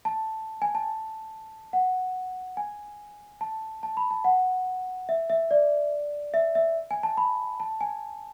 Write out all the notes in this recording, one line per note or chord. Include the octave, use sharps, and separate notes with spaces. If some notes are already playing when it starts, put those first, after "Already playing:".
A5
G#5
A5
F#5
G#5
A5
A5
B5
A5
F#5
E5
E5
D5
E5
E5
G#5
A5
B5
A5
G#5